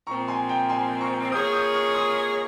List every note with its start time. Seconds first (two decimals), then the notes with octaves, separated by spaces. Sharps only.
0.07 A#2 F3 C4 A#5 C#6
0.28 G#5 C6
0.49 G5 A#5
0.69 G#5 C6
1.01 A#5 C#6
1.32 A#3 F4 G#4 C#5 D#6 G6
1.52 D#6 G6
1.74 C#6 F6
1.94 C6 D#6